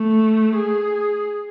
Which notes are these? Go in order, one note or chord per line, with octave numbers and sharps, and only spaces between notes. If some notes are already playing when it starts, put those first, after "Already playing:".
Already playing: A3
G#4